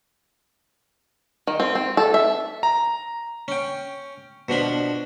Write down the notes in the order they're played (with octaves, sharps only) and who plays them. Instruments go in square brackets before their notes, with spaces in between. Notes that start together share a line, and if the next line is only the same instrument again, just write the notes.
[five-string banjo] D#3
C4
C4
A4
E5
[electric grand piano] A#5
[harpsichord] C#4 G5
B2 F3 D4 B5